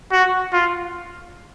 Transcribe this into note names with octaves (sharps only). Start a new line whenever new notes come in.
F#4
F4